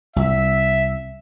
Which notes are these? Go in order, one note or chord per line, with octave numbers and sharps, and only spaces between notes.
C2 E5